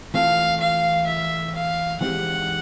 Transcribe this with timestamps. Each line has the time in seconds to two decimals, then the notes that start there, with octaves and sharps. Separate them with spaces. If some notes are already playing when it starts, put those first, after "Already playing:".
0.14 E3 A3 C4 F4 A4 F5
0.60 F5
1.07 E5
1.54 F5
2.01 E3 G#3 C4 D#4 G4 F#5